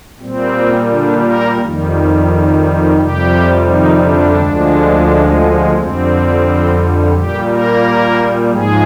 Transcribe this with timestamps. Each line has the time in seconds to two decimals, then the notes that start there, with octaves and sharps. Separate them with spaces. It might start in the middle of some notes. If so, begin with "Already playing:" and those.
0.20 A#2 G3 C4
0.90 D3 D4
1.23 A#3 A#4
1.59 F2 D#3 G3
2.97 F2 C3 G3 G4
3.66 D#3 D#4
4.01 D3 D4
4.35 D2 D3 F3 G#3
5.74 F2 D3 G3 C4
7.13 A#2 G3 G4
7.47 A#3 A#4
8.51 G#2 F3 G#3 G#4